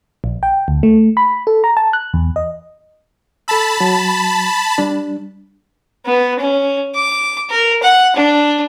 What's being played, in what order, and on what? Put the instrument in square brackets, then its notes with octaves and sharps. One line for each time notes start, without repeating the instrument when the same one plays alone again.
[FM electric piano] A#1
G5
D2
A3
B5
A4
A#5
A5
F#6
E2
D#5
[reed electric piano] A4 E6 [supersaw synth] A5 B5
[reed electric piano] F#3
G3 D4
[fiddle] B3
C#4
D6
A#4
F#5
D4